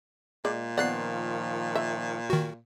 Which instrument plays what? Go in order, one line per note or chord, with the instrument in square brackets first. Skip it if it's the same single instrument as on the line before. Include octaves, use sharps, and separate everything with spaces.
[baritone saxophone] A#2 [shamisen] G#3 D5
[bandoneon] D#3 F3 [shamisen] B3 F#5 [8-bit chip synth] D5 F#6 C7
[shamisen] E5
[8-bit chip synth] D#3 F#4